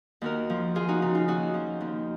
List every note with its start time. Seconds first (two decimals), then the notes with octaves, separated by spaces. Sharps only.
0.21 D#2 F#4 A#4
0.50 F3
0.75 D#2 F4 G#4
0.88 D#4 F#4
1.02 C#3 D#4
1.15 F4
1.28 D#2 D#4 F#4
1.54 F3
1.81 D#2